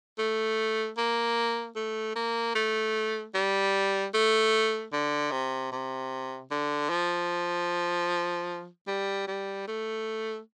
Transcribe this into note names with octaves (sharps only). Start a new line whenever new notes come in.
A3
A#3
A3
A#3
A3
G3
A3
D3
C3
C3
D3
F3
G3
G3
A3